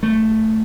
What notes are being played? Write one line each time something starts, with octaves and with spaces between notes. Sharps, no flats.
A3